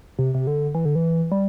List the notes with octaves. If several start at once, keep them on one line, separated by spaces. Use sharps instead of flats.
C3
C3
D3
E3
D3
E3
G3